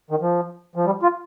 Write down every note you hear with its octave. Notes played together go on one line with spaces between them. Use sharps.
D#3
F3
F3
G3
F4